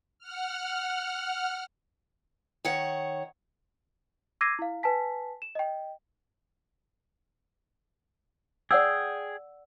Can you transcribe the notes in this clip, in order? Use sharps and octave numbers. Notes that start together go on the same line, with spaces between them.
F#5 F6
D#3 C#5 F#5
D6 E6 G#6 A#6 C7 D#7
E4 F5
B4 G#5 A5 B6
E7
D#5 G5
G#4 D5 F#5 G5 E6